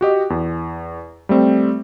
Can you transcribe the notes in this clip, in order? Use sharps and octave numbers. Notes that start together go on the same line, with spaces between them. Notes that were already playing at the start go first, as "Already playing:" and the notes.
F#4 G4 D#5
E2
G3 A3 C4